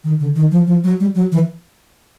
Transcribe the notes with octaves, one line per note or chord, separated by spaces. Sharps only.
D#3
D3
D#3
F3
F3
F#3
G3
F#3
E3